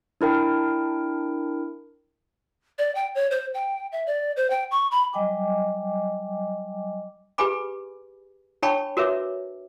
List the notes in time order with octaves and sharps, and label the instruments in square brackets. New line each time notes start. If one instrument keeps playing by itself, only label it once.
[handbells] D4 E4 A#4 G5
[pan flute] D5
G5
C#5
C5
G5
E5
D5
C5
G5
C#6
B5
[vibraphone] F#3 G3 D#5 G5 G#5 D6
[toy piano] G4 G#4 B4 G#5 B5 D6
D4 C#5 G5 A5 B5 C#6
F#4 A#4 B4 C#5 E5 D6